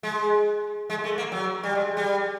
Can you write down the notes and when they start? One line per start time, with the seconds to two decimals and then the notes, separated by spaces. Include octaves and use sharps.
0.03 G#3
0.90 G#3
1.04 A3
1.18 A#3
1.32 F#3
1.64 G3
1.75 G#3
1.97 G3